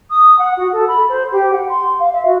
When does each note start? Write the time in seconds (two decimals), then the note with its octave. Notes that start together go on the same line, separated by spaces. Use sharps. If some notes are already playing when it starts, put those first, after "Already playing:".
0.10 D#6
0.39 F#5
0.57 F#4
0.73 A4
0.88 B5
1.09 C5
1.32 G4
1.53 F#5
1.69 C6
1.99 F5
2.13 E5
2.25 F#4